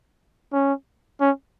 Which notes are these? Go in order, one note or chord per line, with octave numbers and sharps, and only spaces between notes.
C#4
C#4